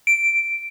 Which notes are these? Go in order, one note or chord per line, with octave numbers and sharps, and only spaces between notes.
D7